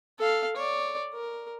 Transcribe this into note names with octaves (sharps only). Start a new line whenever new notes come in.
A4 F5
C#5 D5
A#4